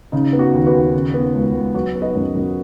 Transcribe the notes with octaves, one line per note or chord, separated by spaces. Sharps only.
C#3 D#4
B3
F#4
D#2
F#4 B4
D#2
C#3
B3
C#2
C#2
F#3 F#4 B4
B3
B4 D#5
F#2
F#2